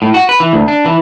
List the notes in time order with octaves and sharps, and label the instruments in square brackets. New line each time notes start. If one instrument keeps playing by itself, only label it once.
[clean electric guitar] A2
F#4
B4
E3
D2
D4
E3